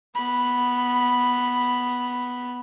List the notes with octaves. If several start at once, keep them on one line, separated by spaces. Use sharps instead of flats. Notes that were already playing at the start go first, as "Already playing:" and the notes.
B3 B5